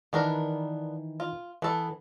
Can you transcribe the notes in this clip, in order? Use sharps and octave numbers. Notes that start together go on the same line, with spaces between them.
D#3 E3 B3 D4 A#4
F4
E3 B3 A4